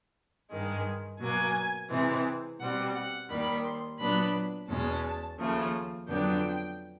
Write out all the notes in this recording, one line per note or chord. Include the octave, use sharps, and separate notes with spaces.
G2 D#3 G#3
B2 F#3 A#3 G#5
C3 E3 G#3 C4
B2 G3 C4 F#5
F#5
D#2 D#3 G3 B5
C6
A#2 F#3 B3 D4 B5
E2 B2 G#3 C#4 A5
D#2 C#3 F3 A3
F2 D3 F#3 B3 D4 G5